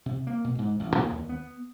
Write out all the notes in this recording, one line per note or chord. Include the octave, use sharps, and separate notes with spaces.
C3
A#3
B2
G#2
A1
A#2
D#2
B3